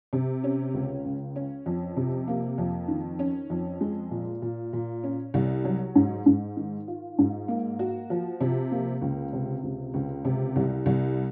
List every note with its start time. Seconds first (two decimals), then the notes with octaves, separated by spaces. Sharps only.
0.13 C3
0.44 C#4
0.74 C#2
1.05 C#3
1.36 C#4
1.66 F2
1.97 C3
2.28 A#3
2.58 F2
2.88 D#3
3.19 C#4
3.50 F2
3.81 G#3
4.11 A#2
4.42 A#2
4.73 A#2
5.04 C#4
5.34 C2
5.65 F#3
5.95 G#2
6.26 G#2
6.57 D#3
6.88 F4
7.19 G#2
7.48 A#3
7.79 F#4
8.10 F3
8.41 C3
8.71 A#3
9.02 C#2
9.33 C3
9.63 C#2
9.94 C#2
10.25 C3
10.56 C2
10.86 C2